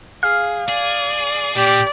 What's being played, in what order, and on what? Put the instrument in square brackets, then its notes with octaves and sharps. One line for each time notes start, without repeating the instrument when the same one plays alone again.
[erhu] G#4 [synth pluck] F5
[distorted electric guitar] G#4 [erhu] D5
[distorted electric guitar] A#2 [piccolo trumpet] G4 [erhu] D5